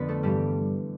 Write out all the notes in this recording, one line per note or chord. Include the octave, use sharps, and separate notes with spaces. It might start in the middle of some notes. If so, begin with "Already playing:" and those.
Already playing: F2 D3 B3 B4
A3 A4
G2 E3 G3 G4